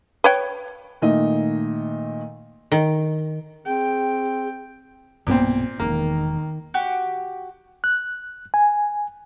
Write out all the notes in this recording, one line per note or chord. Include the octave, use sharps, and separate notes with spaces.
B4 C#5 G5
A#2 D#3 A3 D#5
D#3
C4 G#4 G5
B1 G2 A#2 B3 C4
E1 D#3 A#3
F#4 G4
F#6
G#5